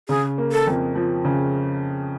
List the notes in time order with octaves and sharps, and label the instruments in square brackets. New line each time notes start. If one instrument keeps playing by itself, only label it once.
[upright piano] C#3 [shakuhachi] G#4
[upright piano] A#3
[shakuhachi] A4
[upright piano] F2
F3
C#3